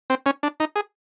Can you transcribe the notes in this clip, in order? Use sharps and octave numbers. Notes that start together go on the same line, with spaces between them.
C4
C#4
D4
D#4
G#4